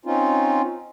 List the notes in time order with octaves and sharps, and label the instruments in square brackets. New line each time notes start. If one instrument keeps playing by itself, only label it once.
[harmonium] C4 C#4 D#4 F4